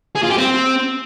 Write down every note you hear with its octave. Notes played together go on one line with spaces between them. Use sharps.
G#4
F4
G4
C4